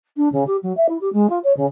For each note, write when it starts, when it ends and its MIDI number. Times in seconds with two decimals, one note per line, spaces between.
0.16 0.28 62
0.32 0.43 49
0.46 0.56 67
0.62 0.74 54
0.76 0.86 76
0.88 0.97 64
1.00 1.11 67
1.12 1.29 56
1.29 1.38 65
1.43 1.52 73
1.56 1.65 49